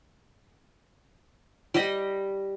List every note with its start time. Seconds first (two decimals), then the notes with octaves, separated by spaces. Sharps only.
1.74 G3 G4 D#5